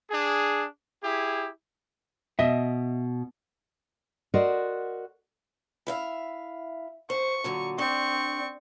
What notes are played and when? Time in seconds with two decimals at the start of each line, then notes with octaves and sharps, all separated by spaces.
0.10 D4 G#4
1.03 E4 G4 G#4
2.39 B2 D#5 E5
4.34 F#4 A#4 C5 D5 D#5
5.87 E4 E5 F5
7.10 C5 C#6
7.44 A#2 D3 F#3
7.78 C4 D4 C#6